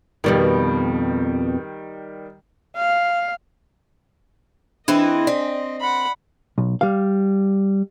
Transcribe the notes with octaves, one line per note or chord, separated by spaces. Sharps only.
F2 B2 D#3 G3 B3
F5
E3 C4 D4 E4 D#5
C4 D5
F#5 B5
B1
G3 F5